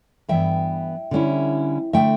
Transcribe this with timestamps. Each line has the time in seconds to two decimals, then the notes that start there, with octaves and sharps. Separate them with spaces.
0.29 G2 E3 B3 E5 G5
1.11 D3 G3 C#4 E4
1.93 D3 A3 E5 G5